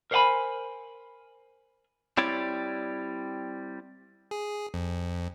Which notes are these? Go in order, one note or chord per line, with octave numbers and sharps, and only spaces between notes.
A#4 C5 C#5 F#5 G#5 B5
G3 C4 E4 C#5 D5
G#4
F2